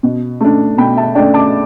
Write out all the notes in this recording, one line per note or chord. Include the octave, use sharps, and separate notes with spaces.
B2
A3 D4
B2 G5 B5
E5 A5
A3 D4 D5 G5
A5 D6